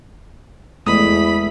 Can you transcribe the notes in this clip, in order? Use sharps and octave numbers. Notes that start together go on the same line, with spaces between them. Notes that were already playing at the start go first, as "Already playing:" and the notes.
E2 G#3 A3 B5 D#6